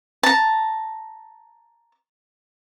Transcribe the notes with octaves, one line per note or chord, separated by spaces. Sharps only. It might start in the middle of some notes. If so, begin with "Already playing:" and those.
A5 A#5